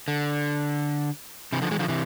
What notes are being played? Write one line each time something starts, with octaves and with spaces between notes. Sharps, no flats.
D3
C3 E3
D3 F3
E3 G#3
D3 F3
C3 E3